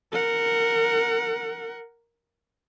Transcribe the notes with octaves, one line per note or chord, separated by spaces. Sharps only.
A#4 F#5